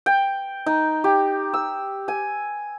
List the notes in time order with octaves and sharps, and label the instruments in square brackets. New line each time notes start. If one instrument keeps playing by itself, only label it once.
[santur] G5
D#4
G4
E6
G#5